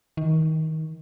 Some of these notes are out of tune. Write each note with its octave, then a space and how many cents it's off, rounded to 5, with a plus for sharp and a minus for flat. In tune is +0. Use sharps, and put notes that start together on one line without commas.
D#3 +25